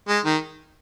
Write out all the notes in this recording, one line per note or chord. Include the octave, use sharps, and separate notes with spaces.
G#3
D#3